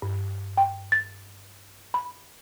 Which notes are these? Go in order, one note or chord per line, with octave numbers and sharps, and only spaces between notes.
G2
G5
A6
B5